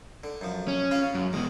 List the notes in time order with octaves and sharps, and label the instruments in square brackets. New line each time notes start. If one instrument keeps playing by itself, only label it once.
[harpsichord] D3
F#2 F3
[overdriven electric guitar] C#4
[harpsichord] C#3 F4
[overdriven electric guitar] F#2
[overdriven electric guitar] E2 B2 [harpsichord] G#3